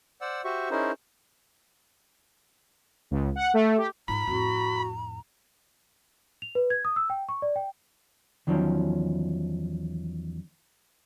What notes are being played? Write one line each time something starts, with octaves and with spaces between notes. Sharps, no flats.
C5 D5 F#5 E6
F#4 G4 C5 E5 C#6
C#4 D#4 E4 G#4 A#4 C5
C#2
F#5
A3
G4
G#2 F4 A#5 B5
F2 A2 F#4
F7
B4
G#6
D#6
E6
G5
C#6
D5
G5
E2 D#3 F3 F#3 C4 C#4